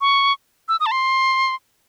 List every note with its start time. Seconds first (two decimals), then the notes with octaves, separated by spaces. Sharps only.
0.01 C#6
0.68 E6
0.80 D#6
0.86 A5
0.91 C6